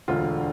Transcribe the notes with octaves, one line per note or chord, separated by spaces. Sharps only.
E1 D2 D3 F4